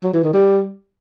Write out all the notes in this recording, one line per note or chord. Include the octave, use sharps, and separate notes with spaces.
F#3
E3
D#3
G3